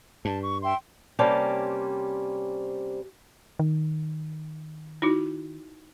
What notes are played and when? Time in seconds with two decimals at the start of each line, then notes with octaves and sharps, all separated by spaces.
0.25 G2 A5
0.42 C#6
0.63 E5 G5 C6
1.19 C3 G3 A#3 C#4 C5 A5
3.59 D#3
5.02 D#4 E4 F#4